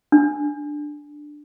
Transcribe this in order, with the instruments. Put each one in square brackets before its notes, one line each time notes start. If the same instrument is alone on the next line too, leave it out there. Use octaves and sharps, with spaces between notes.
[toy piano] D4